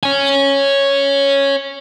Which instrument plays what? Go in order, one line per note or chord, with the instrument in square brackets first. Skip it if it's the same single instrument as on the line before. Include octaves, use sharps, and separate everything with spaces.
[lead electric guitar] C#5 G#5